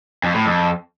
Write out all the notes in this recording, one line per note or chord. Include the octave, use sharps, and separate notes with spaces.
F2
A2
F2